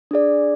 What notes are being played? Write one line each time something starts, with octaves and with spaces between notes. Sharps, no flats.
D4 G#4 D5